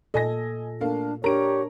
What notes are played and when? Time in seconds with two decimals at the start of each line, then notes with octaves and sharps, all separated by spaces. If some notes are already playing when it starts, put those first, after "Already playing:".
0.14 A#2 A4 D#5 G#5 A#6
0.81 A3 A#3 D4 F5
1.24 D4 G4 A#4 C#5 A#5 D7